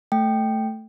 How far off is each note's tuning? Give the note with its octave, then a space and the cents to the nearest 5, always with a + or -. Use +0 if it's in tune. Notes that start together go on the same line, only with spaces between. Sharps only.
A3 +0 G5 +0